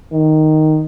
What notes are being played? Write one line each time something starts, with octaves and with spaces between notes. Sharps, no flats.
D#3